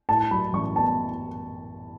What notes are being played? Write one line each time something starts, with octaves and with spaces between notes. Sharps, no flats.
A2 A5
F#3 B5
A1 C#6
B3 A5